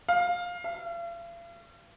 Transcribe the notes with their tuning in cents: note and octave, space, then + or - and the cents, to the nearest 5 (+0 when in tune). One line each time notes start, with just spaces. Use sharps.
F5 +15
F5 -45